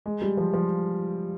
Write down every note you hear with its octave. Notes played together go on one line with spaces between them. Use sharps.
G#3
G3
F3
F3